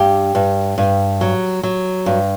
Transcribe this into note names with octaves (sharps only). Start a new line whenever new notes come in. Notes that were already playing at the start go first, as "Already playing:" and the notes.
Already playing: G2 G4
G2
G2
F#3
F#3
G2